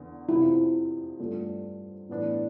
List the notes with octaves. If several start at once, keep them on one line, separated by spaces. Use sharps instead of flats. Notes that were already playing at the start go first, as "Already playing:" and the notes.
Already playing: E2 D3
F2 C3 F3 E4
G2 D3 A3 D4 F4
A2 E3 B3 D4